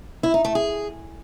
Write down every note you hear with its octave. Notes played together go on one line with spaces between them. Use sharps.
E4
D#4
A3
G#4